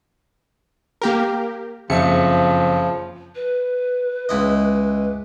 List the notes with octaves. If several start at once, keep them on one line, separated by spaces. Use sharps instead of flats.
A#3 G4 A#4
F#1 F2 F3 E5 C#7
B4
C#2 E4 D#5